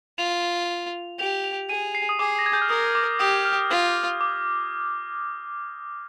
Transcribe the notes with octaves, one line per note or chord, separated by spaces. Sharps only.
F4 F7
G4 F7
F7
G#4 D#7
C7
D#6
G#4 D6
A#6
G#6
G6
F6
A#4 D#6
D6
G4 D#6
F6
F4 F6
D6